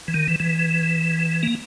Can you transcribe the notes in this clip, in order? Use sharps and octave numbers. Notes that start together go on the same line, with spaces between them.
E3
D#3
E3
E3
A#3